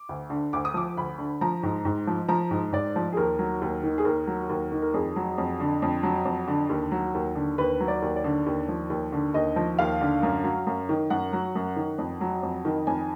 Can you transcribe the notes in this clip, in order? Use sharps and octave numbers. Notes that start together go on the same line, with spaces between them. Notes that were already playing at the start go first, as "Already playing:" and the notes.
Already playing: D6
D2
D3
D2 D6
D#6
F3 D6
D2 B5
D3
F3 A#5
G#2
G#2
F3
F3 A#5
G#2
G#2 D5
F3
G#4
D#2 A#4
F#3
D#2
D#3
G#4
D#2 A#4
F#3
D#2
D#3
A#4
F2 G#4
F#3
F2
D3
F2
F#3
F2
D3
D#2
F#3
D#2
D3
D#2 B4
F#3
D5
D#2
D5
D3
D#2
F3
D#2
D3
D#2 D#5
F3
D#2 F5
D3
F#2
F#3
F#2
D#3
F#2 F#5
F#3
F#2
D#3
F2
F#3
F2
D#3
F2 G#5